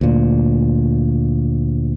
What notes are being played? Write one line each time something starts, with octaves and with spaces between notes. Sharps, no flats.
D2 A#2